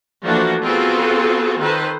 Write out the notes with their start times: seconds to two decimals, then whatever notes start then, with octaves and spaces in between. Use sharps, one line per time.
0.22 E3 F3 A3 A#3 D4 F#4
0.62 B3 C4 F4 F#4 G#4 A4
1.56 D#3 A4 B4 C5